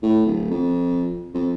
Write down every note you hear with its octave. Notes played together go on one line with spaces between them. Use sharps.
A2
D1
F2
F2